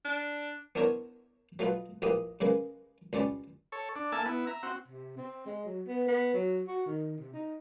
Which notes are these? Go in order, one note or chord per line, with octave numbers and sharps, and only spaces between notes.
D4
B3 D4 E4 A#4 C5 C#5
F#3 A3 D#4 F4 B4
A#1 A2 A#3 G4 B4 D#6
C#3 G#3 A#3 B4
C#2 G2 G3 C#4 D5
A4 C#5
D4
A#3 A4 E5 G#5 A5
B3 E4
E5 A#5
C4 F#4
C3
C4
G#3
F#3
B3
B3
F#3
F#4
D#3
C3
D#4